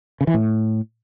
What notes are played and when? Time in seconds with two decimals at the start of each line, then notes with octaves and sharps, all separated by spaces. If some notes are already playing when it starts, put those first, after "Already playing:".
0.21 C#3
0.27 E3
0.34 A2